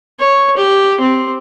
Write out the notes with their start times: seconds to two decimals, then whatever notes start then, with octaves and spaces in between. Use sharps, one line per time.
0.19 C#5
0.57 G4
1.01 C4